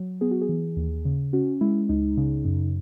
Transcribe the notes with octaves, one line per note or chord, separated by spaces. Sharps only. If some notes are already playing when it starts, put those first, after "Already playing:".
Already playing: F#3
B3 G#4
F#4
G#4
E3
D#2
C#3
C#4 F#4
G#3 E4
C#2 D#4
C#3
F#2